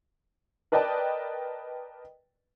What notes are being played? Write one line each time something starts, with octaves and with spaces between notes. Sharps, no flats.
A#4 B4 D5 D#5 G5 A5